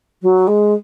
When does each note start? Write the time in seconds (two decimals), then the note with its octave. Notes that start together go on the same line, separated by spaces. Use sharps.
0.22 F#3
0.47 G#3